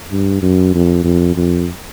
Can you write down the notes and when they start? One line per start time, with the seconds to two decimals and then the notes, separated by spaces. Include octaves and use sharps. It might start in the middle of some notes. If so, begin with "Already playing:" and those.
0.11 G2
0.42 F#2
0.74 F2
1.04 F2
1.35 F2